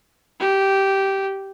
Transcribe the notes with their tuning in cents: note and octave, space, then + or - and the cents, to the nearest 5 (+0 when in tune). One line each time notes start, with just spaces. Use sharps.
G4 -10